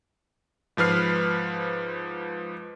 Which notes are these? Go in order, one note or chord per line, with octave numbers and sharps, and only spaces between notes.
G#2 F3 B4 F6 C7